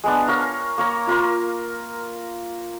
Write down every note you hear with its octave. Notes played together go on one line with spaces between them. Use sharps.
G#3 B3 D4
A#4 C#5 F5 A#5
A#3 C#5 A#5
F4 A#4 C6